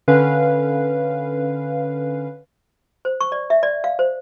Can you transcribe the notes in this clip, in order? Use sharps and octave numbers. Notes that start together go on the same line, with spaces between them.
D3 C#4 B4 F5
C5
C#6
D5
E5
D5
F5
C5